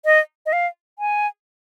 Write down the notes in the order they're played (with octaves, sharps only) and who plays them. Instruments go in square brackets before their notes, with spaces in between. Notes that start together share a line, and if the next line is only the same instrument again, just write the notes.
[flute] D#5
D#5
F5
G#5